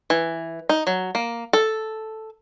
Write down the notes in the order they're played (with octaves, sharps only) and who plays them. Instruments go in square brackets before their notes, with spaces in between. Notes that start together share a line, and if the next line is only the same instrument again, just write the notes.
[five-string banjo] E3
D#4
F#3
A#3
A4